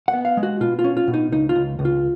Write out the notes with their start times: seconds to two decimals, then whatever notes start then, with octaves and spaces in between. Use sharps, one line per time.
0.08 F#5
0.13 B3
0.25 F5
0.37 G#3
0.43 F#4
0.61 B2 F4
0.79 F4
0.84 C#4
0.97 F4
1.08 B2
1.14 D#4
1.32 C#2 D#4
1.49 F4
1.55 C#2
1.79 C#2
1.85 F4